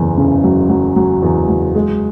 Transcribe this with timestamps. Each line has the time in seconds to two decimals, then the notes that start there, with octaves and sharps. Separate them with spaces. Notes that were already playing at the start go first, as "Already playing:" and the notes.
Already playing: F#1 E2
0.18 C#3
0.44 F#3
0.70 F#3
0.96 F#3
1.23 E2
1.49 F#3
1.75 G#3